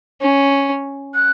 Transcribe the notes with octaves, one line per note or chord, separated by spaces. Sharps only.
C#4
F#6